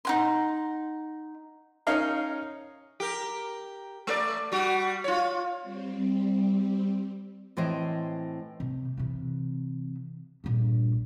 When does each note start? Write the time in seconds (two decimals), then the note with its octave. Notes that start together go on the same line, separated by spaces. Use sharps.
0.05 D#4 F#5 C6
1.87 C#4 D#4 A#4 C#5 D#5 F5
3.00 G4 A#4
4.07 A3 A#4 D5
4.52 G3 F#4
5.04 F4 C#5
5.62 G3 C4
7.57 A2 E3 C4 C5 C#5 D#5
8.60 C3
8.97 C3 E3
10.44 A#1 G2